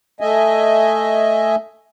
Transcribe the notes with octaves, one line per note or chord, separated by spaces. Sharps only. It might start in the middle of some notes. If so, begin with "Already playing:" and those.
A3 D#5 E5 G#5